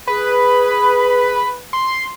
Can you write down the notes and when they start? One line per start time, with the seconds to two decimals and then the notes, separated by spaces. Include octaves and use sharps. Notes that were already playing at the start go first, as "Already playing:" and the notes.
0.07 G#4 B4 B5
1.73 C6